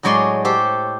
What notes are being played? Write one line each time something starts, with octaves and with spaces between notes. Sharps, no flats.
A2 F#3 G#3 C#5 D5 C6
G4 A4 C5 C#5